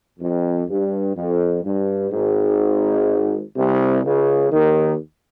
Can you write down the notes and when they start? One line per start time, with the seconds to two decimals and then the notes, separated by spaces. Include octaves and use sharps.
0.20 F2
0.68 G2
1.16 F2
1.64 G2
2.11 G#1 G#2
3.56 C2 C3
4.03 C#2 C#3
4.52 D#2 D#3